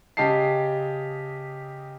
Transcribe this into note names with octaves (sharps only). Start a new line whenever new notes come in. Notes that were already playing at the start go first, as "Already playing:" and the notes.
C#3 G4 D#5 A5 C7